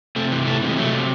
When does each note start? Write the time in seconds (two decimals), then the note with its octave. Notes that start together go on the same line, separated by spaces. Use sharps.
0.16 C3 A3
0.32 E3
0.47 C3 A3
0.61 C3
0.68 G#3
0.77 F#3 A3
0.92 C3